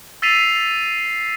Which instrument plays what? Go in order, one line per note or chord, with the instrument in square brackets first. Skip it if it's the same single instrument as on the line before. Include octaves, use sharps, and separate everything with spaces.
[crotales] E6 A6 B6 C7 D#7 F7